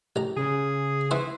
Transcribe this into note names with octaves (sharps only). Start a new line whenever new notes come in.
A1 A#5
C#3 G#4
E3 E4 C5